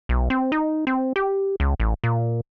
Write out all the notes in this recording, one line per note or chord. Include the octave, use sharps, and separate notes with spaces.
B1
C4
D#4
C4
G4
C#2
A1
A#2